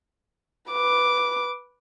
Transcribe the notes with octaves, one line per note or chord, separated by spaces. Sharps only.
B4 D6